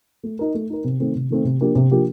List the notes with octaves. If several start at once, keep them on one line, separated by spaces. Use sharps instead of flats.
A3
D#4 A#4
A3
D#4 A#4
C3
D#3 A3 C4
C3
D#3 A3 C4
C3
F3 A#3 D4 G4
C3
F3 A#3 D4 G4